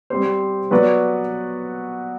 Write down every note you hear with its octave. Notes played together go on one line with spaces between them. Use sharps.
G3 C4 G4 C5
F#3 B3 F#4 B4 D5